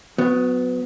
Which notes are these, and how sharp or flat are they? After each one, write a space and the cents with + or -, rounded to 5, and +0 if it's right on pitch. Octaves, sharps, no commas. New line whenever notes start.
F#3 -20 B3 +20